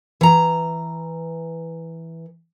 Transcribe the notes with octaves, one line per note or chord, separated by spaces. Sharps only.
E3 A#5